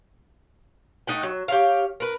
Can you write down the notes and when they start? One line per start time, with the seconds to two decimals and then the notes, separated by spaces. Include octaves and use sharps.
1.07 A3 D#4 F#5 G5
1.23 F#3
1.48 G4 C#5 F5
2.00 A#4 B4